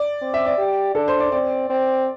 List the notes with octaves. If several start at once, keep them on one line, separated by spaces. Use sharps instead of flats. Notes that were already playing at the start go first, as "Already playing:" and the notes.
Already playing: D5
C4
E5
D5
G4
D4 A4
C5
D5
C4 D5
C4